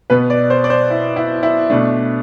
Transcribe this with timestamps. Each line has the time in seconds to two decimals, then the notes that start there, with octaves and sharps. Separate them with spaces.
0.10 B2 B3 B4
0.30 D5
0.50 C5
0.64 D5
0.70 C5
0.90 E4
1.16 E4
1.43 E4
1.70 B2 A3 D4